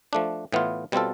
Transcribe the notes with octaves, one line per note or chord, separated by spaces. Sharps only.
F3 A3 D4
A2 E3 B3 F4
B2 G3 C4 F4 A4